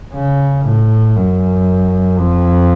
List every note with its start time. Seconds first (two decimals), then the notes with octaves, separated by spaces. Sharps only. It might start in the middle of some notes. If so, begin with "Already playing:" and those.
0.13 C#3
0.64 A2
1.16 F#2
2.18 F2